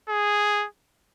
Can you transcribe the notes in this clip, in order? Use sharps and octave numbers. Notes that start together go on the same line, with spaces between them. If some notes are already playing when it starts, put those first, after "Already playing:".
G#4